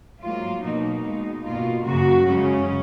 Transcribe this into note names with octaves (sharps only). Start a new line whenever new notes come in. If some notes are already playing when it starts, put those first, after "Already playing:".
G#2 F#3 A#3 F4
B2 F#3 A#3 D#4
B2 G#3
B2 A#3 F4
F#2 C#3 F#3 A#3 F#4
F#2 C#3 G#3 C#4